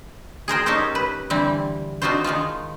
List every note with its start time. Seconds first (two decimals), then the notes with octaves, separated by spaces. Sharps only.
0.48 G#4 A#4 C5 G5
0.66 C#4 D#4 G4 A4 A#4 C5
0.95 B4
1.30 D3 E3 G3 C4
2.02 C4 D4 D#4 F4 F#4 C5
2.24 D#3 G#3 D#4 F4